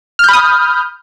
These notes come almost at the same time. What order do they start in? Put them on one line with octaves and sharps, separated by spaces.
F6 G6 B5 D#6